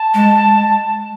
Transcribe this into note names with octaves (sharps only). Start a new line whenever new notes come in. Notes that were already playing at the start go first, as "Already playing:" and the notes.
Already playing: A5
G#3